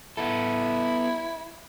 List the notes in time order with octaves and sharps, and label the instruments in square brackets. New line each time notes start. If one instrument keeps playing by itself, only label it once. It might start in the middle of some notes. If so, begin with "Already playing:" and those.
[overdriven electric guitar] B3 A4 [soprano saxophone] E4